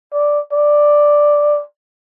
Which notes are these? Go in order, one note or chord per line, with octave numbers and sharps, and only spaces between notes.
D5
D5